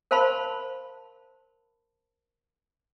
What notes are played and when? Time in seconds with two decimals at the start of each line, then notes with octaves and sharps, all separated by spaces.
0.11 A#4 C5 F5 A5 B5 C6